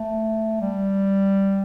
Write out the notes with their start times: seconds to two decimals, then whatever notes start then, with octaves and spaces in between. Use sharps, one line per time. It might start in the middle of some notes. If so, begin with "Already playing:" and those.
Already playing: A3
0.61 G3